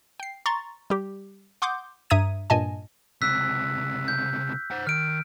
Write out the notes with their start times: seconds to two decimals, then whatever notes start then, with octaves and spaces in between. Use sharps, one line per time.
0.20 G5 C7
0.46 A#5 C6 C#6 A6
0.90 G3 G4
1.62 F#5 C6 D6 D#6 G6
2.10 G2 E5 A#5 D#6 G#6 D#7
2.50 G2 A#2 D#5 G#5 A5
3.22 C#2 C3 E6 F#6 B6
4.08 G6
4.71 C5 F#5
4.87 D#3 F6 D7